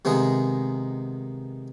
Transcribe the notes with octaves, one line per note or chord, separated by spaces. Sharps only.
C3 D#3 G#3 B3 G#4